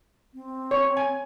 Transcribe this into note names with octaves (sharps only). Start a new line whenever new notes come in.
C4
C#5
G#5